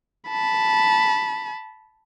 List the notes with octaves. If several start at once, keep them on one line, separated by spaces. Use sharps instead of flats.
A5 B5